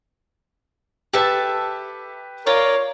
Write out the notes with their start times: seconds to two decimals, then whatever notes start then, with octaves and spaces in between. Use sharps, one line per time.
1.13 G4 A4 B4 E5 A5
2.47 F4 A#4 C#5 D5